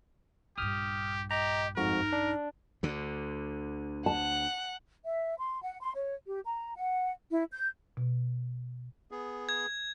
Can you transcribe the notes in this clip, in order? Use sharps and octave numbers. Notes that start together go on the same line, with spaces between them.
A#1 G2 G4 D#6 F6
G4 D#5 A#5
F2 G#2 D#4 F#4 A#4
D4
D2 D3
F#5 A5
E5
C6
F#5
C6
C#5
G4
A#5
F#5
E4
G6
B2
B3 G#4
G#6